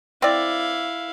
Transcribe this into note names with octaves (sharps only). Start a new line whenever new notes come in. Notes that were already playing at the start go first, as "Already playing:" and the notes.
C4 E4 D5 F5